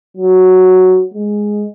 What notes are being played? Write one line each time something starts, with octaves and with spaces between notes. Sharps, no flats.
F#3
G#3